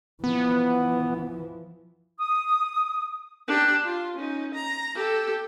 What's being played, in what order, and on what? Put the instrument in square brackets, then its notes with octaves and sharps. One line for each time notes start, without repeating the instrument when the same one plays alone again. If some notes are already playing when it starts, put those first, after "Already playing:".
[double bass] E3 F3 [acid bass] B3
[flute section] D#6
[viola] D4 G4
F4
C#4 D#4
A#5
G4 A4